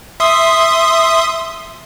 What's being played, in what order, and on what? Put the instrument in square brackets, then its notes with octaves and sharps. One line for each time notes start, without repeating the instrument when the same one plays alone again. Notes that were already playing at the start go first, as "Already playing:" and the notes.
[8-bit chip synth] E5 C6 D#6